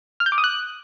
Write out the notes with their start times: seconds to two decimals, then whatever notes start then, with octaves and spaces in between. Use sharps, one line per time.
0.20 F6
0.26 G6
0.32 D6
0.38 D#6
0.44 F#6